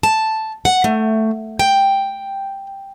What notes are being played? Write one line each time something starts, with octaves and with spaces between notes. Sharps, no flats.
A5
F#5
A3
G5